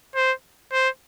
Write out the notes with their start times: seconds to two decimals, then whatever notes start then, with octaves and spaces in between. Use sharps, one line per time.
0.16 C5
0.72 C5